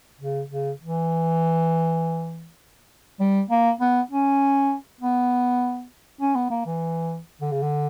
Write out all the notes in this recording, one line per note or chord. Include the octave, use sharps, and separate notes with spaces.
C#3
C#3
E3
G3
A#3
B3
C#4
B3
C#4
B3
A#3
E3
D3
C#3
D3